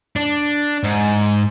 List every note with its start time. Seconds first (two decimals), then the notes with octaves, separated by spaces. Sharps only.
0.16 D4
0.84 G#2